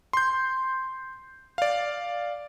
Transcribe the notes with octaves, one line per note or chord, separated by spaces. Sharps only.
C6 G6
D5 F5